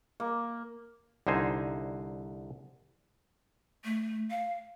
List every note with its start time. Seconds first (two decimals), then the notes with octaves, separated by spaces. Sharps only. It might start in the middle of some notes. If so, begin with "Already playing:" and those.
0.20 A#3
1.27 C2 D3 D#4 C5 G#5
3.85 A3
4.30 F5